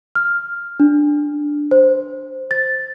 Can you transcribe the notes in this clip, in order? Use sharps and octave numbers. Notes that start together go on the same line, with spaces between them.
F6
D4
C5
A6